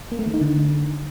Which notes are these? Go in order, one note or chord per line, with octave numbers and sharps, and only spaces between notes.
A#3
A3
D#3
D#4
D3